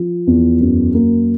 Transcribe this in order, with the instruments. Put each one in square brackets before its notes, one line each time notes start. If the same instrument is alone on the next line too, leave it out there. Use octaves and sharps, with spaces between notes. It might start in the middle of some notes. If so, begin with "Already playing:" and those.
Already playing: [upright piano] F3
E2
F#2
A#3